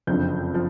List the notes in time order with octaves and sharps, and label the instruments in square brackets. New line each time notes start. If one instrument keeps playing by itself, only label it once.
[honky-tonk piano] F#1 F2 D3 F3 G6
F3